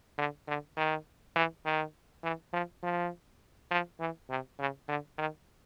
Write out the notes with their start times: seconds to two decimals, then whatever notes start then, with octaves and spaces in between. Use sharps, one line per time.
0.18 D3
0.48 D3
0.77 D#3
1.36 E3
1.65 D#3
2.23 E3
2.53 F3
2.83 F3
3.71 F3
4.00 E3
4.30 C3
4.59 C#3
4.88 D3
5.18 D#3